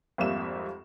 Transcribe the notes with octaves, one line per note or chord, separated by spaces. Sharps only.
G#1 F2 G3 A#3 E5 E7